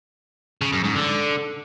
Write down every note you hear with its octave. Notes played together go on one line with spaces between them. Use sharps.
C#3
F#2
G#2
D3